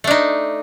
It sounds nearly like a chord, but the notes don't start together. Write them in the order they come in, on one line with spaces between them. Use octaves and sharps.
A3 D4 D#4